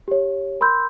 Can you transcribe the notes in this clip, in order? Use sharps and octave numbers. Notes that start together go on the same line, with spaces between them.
G4 C#5
A#4 B5 C6 E6 G6